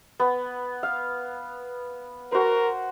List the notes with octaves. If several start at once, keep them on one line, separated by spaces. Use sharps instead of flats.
B3
F5
F#4 A#4 C5